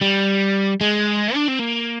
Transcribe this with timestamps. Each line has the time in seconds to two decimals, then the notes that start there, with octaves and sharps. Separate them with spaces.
0.01 G3
0.81 G#3
1.35 D4
1.48 C4
1.60 A#3